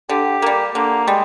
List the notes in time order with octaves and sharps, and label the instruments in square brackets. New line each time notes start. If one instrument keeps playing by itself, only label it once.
[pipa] D3 [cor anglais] G4
[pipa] G3 A#3
[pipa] D3 [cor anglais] A#3
[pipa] G3 [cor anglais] G#3